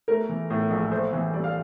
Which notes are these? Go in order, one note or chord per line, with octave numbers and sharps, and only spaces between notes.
A3 A#4
E3
A2
A#1
A3 C5
E3
G2 D5
F5